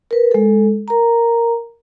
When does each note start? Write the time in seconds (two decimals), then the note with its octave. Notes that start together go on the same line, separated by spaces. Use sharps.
0.11 A#4 B4
0.31 G#3 A4
0.88 A#4 A#5